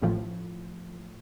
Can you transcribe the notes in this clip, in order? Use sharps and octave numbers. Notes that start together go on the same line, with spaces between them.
A1 A2 F3